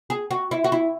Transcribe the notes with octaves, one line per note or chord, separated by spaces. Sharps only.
G#4
F#4
E4
F#4
E4